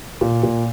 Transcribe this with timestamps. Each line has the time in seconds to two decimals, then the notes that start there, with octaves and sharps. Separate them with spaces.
0.21 A#2
0.43 A#2